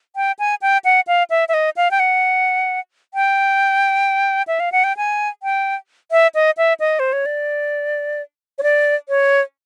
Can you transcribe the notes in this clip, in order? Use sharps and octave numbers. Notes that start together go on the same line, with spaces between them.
G5
G#5
G5
F#5
F5
E5
E5
D#5
F5
G5
F#5
G5
E5
F5
F#5
G5
G#5
G5
E5
D#5
E5
D#5
C5
C#5
D5
C#5
D5
C#5